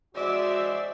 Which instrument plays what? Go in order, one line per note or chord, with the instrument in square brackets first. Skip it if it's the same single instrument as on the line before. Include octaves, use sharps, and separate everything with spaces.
[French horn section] G#3 F#4 C5 [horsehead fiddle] D5 E5